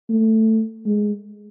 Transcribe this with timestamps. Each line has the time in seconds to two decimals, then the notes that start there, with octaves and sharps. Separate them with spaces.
0.09 A3
0.86 G#3